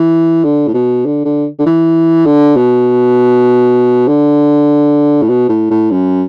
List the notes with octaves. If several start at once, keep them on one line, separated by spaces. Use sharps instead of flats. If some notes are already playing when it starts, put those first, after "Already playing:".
Already playing: E3
D3
A2
B2
D3
D3
D3
E3
D3
B2
D3
A2
B2
A2
A2
F#2